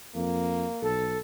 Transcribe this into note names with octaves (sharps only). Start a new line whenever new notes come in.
F2 A#3
B1 A4